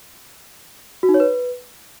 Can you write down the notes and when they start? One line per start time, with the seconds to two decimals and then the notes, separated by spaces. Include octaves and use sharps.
1.03 F#4
1.09 D#4
1.14 C#5
1.20 B4